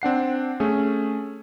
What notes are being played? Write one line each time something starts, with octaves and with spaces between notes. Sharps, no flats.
C4 D4 F#5 C7
A3 C#4 G#4